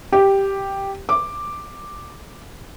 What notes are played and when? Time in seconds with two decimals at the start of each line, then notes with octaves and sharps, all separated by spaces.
0.12 G4
1.09 D6